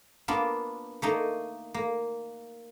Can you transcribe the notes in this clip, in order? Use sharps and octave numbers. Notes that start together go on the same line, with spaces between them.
A#3 B3 D4 F4
A3 A#3 D#4
A#3